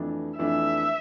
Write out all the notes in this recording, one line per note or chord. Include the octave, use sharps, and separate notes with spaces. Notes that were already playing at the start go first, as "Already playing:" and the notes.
Already playing: F2 E3 A3 D4
F2 E3 A3 D4 E5